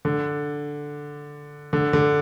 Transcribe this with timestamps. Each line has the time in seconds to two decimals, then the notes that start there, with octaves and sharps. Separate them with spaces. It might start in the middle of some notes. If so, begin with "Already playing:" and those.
0.05 D3
1.73 D3
1.93 D3